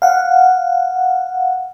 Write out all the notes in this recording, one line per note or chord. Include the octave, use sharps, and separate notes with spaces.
F5 F#5